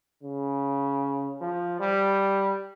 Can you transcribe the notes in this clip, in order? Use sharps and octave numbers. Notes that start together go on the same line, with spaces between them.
C#3
F3
G3